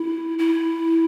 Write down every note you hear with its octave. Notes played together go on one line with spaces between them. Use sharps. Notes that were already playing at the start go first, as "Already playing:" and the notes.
Already playing: E4
E4